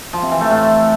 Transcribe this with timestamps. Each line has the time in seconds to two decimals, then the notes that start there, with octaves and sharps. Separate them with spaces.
0.13 F3
0.22 C3
0.32 E3
0.41 A3
0.50 A2